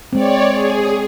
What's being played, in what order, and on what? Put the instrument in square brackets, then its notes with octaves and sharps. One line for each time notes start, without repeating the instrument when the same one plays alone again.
[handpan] G#3 C4 [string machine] C#5 D5
[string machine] G#4